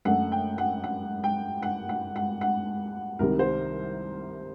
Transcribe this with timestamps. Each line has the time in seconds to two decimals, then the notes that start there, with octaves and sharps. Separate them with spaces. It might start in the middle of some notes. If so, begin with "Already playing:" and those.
0.05 F#2 D3 A3 F#5
0.32 G5
0.58 F#5
0.84 F#5
1.24 G5
1.63 F#5
1.89 F#5
2.16 F#5
2.41 F#5
3.19 C2 C3 D#3 G3 A#4
3.39 C5